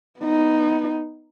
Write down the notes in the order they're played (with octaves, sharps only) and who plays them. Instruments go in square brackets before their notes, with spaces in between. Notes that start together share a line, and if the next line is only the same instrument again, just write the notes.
[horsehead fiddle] B3 D#4